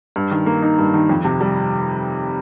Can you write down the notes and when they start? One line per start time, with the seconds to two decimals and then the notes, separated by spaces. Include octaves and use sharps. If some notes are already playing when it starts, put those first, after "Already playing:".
0.16 G2
0.31 D#3
0.46 A#3
0.62 D#4
0.78 G2
0.94 D#3
1.09 F2
1.25 C3
1.41 G3